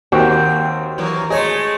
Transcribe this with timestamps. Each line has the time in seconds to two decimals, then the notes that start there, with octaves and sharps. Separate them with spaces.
0.12 D#2 C4 F#4 A#4 G5
0.98 E3 F#3 A#3
1.30 G#3 A3 G#4 C#5 D#5